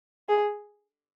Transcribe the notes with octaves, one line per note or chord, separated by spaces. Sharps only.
G#4